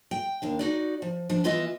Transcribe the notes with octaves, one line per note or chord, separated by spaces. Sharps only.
G5
D#2 D4 F5
D#4 F#4 D5
F3
F3 D4
E3 B3 F4 D#5 E5